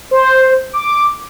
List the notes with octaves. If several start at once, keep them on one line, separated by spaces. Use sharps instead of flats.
C5
D6